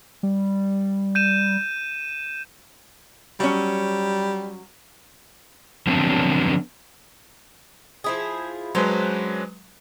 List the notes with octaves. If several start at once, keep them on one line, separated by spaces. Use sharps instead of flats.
G3
G6 D#7 E7
F#3 G3 C#4
D3 F3 F#3 B3 C4 D4
F3 E4 G#4
F#3 G#3 C#4 D4 B4 C5